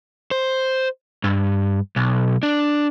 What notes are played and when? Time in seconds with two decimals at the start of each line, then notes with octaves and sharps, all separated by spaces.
0.31 C5
1.24 G2
1.96 B1
2.43 D4